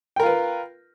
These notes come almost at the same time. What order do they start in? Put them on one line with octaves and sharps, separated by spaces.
G5 A#4 F4 B4